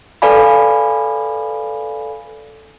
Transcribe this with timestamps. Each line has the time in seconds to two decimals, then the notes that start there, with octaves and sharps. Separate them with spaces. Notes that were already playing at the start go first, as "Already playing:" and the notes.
0.22 A4 B4 D5 F5 G#5 B5